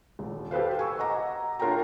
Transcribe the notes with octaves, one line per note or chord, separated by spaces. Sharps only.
D#1
G4 A4 B4 C5 F5
G#5 C#6 E6
D#5 F#5 A#5 D6
D4 F4 A#4 C#5 G5 A#5